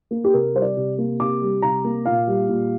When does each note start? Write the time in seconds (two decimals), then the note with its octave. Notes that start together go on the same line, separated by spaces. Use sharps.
0.11 A#3
0.24 G4
0.34 C3 A#4
0.54 G3 C5
0.62 D5
0.76 C3
0.98 A#3
1.20 C3 D6
1.41 G3
1.62 C3 A#5
1.84 A#3
2.06 A#2 F5
2.27 G3
2.49 A#2